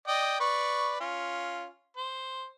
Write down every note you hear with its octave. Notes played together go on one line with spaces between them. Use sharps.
D5 D#5 G5
B4 D5 C#6
C#4 F4
C5